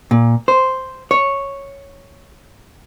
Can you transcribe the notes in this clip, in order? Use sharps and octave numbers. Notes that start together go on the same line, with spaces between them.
A#2
C5
C#5